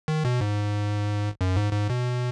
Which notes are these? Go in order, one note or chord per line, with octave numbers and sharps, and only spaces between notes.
D#3
B2
G#2
F#2
G#2
G#2
B2